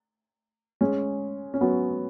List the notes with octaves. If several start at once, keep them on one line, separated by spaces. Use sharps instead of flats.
G#3 C#4
C#4
F#3 B3